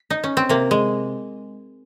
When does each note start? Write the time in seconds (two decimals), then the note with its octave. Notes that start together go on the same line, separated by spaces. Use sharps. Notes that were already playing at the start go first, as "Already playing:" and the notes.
Already playing: F4
0.10 D#4
0.24 C#4
0.37 C4
0.49 C3 A#3
0.71 G#3